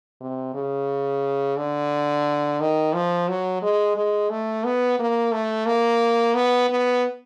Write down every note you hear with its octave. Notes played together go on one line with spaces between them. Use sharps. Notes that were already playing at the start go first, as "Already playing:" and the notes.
C3
C#3
D3
D#3
F3
F#3
G#3
G#3
A3
B3
A#3
A3
A#3
B3
B3